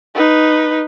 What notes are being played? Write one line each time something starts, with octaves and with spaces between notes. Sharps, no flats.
D#4 B4